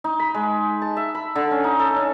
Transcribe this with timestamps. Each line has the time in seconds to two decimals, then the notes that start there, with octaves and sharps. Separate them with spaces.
0.04 D#4
0.20 B5
0.34 G#3
0.82 A5
0.97 E5
1.15 B5
1.35 D3
1.51 C#4
1.64 D#4
1.79 A4
1.96 C#4